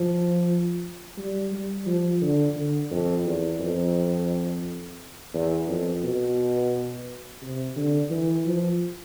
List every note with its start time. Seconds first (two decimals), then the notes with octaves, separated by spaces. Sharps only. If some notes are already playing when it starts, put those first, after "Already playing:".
Already playing: F3
1.18 G3
1.52 G3
1.87 F3
2.22 D3
2.56 D3
2.91 F2
3.26 E2
3.60 F2
5.34 E2
5.68 F2
6.04 B2
7.42 C3
7.76 D3
8.11 E3
8.46 F3